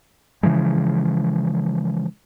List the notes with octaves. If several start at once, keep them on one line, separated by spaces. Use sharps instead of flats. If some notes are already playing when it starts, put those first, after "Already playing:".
C#3 E3 F3 G#3